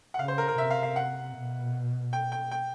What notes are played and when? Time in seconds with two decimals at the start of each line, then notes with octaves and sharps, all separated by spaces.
0.14 F#5
0.19 C#3 F5
0.28 C5
0.38 A#4
0.48 A#4
0.58 C3 E5
0.70 F5
0.83 F5
0.96 F#5
1.35 B2
2.13 G5
2.32 G5
2.51 G5